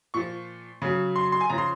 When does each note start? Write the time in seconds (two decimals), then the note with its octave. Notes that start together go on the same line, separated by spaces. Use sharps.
0.14 A#2 F3 C#6
0.82 C#3 F#3
1.16 C6
1.32 C6
1.41 G#5
1.50 C#3 F3 A#5
1.58 C6